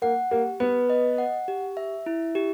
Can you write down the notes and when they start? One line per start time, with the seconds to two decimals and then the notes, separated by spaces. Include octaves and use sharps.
0.02 A#3 F#5
0.31 A#3 G4
0.60 B3 B4
0.90 D#5
1.18 F#5
1.48 G4
1.77 E5
2.06 E4
2.35 G4